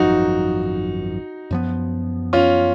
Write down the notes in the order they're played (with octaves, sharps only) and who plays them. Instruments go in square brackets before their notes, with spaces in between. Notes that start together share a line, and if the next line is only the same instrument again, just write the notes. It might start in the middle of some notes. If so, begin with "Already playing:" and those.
Already playing: [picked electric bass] G#1 F#2 F3 [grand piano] D#4 F#4
[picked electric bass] F#2 F3 B3
[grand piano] C#4 F4